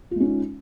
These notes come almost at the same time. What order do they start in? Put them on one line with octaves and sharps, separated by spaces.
F4 G#3 C#4 D#4